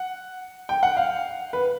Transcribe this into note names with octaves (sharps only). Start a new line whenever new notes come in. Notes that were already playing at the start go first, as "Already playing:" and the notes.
Already playing: F#5
G5
F#5
F5
B4